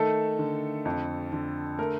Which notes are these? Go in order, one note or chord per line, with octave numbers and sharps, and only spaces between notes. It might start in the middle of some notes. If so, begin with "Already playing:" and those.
Already playing: D#3 A3 A4
D3
F2
D3
A3 A#4